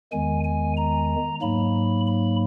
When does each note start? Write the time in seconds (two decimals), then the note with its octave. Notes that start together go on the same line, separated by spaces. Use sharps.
0.12 E2 D#3 G#3 G#5
0.44 G#5
0.77 A#5
1.42 G#2 F#3 A#3 B5
2.07 B5